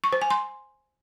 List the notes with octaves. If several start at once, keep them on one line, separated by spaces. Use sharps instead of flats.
C#6
C5
G#5
C6